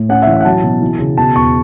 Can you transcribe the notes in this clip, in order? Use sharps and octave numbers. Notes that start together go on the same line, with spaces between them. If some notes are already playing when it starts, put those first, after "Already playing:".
Already playing: A2
C#4 F#5
E5
E3
E5
F#5
F#3 A5
B2
E3
C#3
B2 A5
E2 C#6